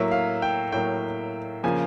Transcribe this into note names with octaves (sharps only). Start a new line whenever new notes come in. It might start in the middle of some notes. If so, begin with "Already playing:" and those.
Already playing: A2 F#3 A#3 E5
F5
G5
A2 F#3 A#3 G5
C#3 F3 A#3 G#5